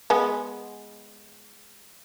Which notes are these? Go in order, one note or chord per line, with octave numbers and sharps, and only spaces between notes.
G#3 B3